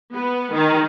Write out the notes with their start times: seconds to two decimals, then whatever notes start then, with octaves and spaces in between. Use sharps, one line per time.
0.13 B3
0.52 D#3